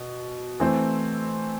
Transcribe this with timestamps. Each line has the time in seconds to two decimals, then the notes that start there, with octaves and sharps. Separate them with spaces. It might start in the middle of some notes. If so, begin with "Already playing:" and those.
Already playing: B2
0.60 E3 A3 C4